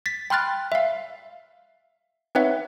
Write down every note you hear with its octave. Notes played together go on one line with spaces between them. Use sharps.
A6 B6
G5 B5 C6 F6 F#6 A6
E5 F5
C4 D#4 B4 C#5 E5 F#5